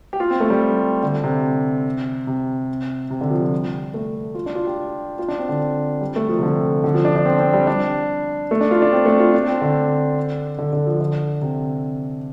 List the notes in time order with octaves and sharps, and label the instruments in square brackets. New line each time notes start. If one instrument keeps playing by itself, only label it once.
[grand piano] G4
F4
C4
A3
G3
D3
C3
C3
C3
D3
F3
G3
A3
F4
D4
F4
G4
F4
D4
C4
D3
G3
A3
F3
C3
D3
D3
F3
D4
D4
C4
C4
G3
D4
A3
D4
F4
D4
C4
A3
F4
D4
C4
D3
D3
D3
F3
D3
C3